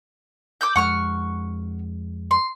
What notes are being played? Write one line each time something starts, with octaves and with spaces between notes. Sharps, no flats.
D6 E6 G6
F2 G#3 F#5 C#6 F6
C6